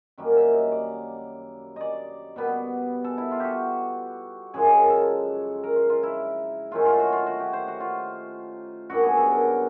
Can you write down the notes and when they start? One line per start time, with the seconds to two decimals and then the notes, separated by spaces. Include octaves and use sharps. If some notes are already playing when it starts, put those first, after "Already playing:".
0.18 F#2 D#3 G3 A#3
0.36 E5
0.54 D#5
0.72 D5
1.76 D5 D#5
2.36 B2 G3 B3
3.04 A4
3.18 E4
3.31 F4
3.40 F#4 G4
4.54 F#2 C#3 F3 G#3 G#4
4.79 A#4
4.90 A4
5.63 A#4
5.76 F4
5.90 F4
6.03 E4
6.71 D#3 F#3 A3 C#4 F4
6.85 F4
6.99 F#4
7.12 F4
7.27 F#4
7.40 G4
7.53 C5
7.68 F#4
7.80 F4
8.90 F#2 D3 G3 B3 F#4
9.04 G#4
9.17 A4
9.31 A#4